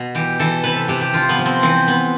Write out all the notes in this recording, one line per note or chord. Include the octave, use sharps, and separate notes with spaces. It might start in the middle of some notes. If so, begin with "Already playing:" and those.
Already playing: B2 B3
E3 G4
E3 A4
C3 B4
A4
C3 G4
G4
F3 F4
B3
F3
C4
E3 C4
B3